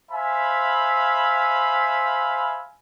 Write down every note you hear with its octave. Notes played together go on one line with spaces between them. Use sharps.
C5 E5 F5 G#5 B5